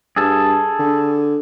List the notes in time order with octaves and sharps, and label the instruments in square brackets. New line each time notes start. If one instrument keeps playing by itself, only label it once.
[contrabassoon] G2 [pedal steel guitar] G#4 A4
[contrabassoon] D3